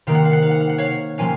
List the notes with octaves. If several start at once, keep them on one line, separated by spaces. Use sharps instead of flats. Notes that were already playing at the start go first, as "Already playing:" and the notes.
C3 D#3 A#3 F5
F#5
F5
F#5
F5
F#5
F5
F#5
C#5 F5
C3 F3 A#3 C#4 F5 G#5